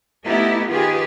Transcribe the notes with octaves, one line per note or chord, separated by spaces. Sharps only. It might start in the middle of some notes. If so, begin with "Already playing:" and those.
A3 B3 D#4 E4 G4 A4
D#3 F4 G4 G#4 B4